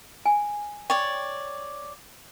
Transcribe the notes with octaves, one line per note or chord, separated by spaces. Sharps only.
G#5
C#5 D5 G5